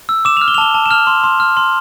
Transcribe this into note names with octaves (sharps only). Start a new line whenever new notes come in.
E6
D6 E7
F6 F7
G7
F7
A5 G7
A5
E7
F6 F7
C6
C6
F6
C6